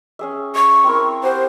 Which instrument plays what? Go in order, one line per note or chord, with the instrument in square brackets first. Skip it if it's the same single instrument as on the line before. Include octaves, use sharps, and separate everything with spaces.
[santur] C#4 G#4 E5
[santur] E5 [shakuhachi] C#6
[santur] C4 E4 A#4
[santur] G4 F#5 [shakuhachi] C5